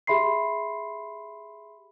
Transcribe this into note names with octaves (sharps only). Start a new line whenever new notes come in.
G4 G#4 E5 B5 C6 C7